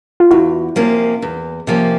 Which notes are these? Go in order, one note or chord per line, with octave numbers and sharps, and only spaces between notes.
F4
E2 E4 F#4
C3 F3 A#3 C#4
E2
C3 F3 A#3 C#4